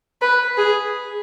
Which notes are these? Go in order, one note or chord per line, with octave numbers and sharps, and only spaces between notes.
B4
G#4